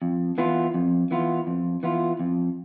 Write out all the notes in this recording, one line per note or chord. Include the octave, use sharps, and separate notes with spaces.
F2
E3 B3 F4
F2
E3 B3 F4
F2
E3 B3 F4
F2